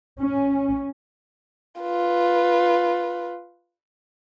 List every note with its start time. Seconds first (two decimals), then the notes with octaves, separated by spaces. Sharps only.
0.20 C#4
1.81 F4 B4